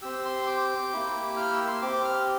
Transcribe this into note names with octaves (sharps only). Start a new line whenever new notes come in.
C4 G4 E6
C6
D6
A#3 E4 G4
F6
E6
C6
C4 G4 D6
F6